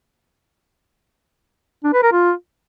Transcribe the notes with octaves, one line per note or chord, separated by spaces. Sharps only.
D4
B4
A#4
F4